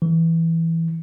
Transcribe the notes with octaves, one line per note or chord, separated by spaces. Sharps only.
E3